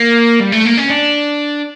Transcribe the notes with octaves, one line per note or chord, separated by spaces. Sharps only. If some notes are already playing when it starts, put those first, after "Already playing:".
Already playing: A#3
G3
A3
A#3
C#4
D4